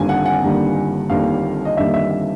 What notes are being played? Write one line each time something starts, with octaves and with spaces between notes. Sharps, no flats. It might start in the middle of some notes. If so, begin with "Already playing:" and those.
Already playing: G1 G2 D#3 G3 A#3 G#5
F#5
F#5
G1 G2 D#3 G3 A#3
G1 G2 D#3 G3 A#3 F5
D#5
G1 G2 D#3 G3 A#3 E5
E5
E5